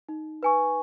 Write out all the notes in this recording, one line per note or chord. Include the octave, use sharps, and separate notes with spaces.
D#4
B4 G#5 C#6